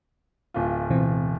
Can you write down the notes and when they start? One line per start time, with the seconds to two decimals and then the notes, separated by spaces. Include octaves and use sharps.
0.54 D1 F4
0.90 B2 E3 C4